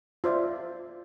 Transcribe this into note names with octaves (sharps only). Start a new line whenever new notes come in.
F4 C5 D5 E5